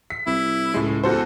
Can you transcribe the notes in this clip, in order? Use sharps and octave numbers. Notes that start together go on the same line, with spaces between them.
B6
C2 E4
C#2 A2 G#3
E2 F#4 A4 C5